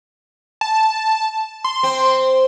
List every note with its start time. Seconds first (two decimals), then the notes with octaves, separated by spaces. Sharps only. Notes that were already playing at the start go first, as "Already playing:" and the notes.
0.61 A5
1.64 C6
1.83 C4